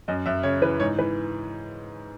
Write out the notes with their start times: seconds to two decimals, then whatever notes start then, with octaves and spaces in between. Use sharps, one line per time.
0.08 F#2 D#5
0.26 F#2 E5
0.43 C#3 C#5
0.62 E3 B4
0.80 G#2 C#5
0.98 E3 B4